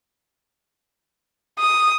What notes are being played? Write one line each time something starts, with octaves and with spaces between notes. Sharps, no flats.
D#6